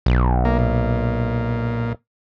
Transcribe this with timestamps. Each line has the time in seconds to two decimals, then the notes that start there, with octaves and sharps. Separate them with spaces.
0.06 B1
0.45 A#3
0.59 A#2